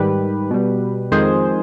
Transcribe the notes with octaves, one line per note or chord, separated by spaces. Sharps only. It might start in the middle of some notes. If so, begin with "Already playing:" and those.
Already playing: G#2 D#3 G3 G4 B4
B2 G3
F2 D#3 G#3 G#4 C5